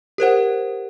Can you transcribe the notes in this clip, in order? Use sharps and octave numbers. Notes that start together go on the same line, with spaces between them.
G4 A#4 C5 F#5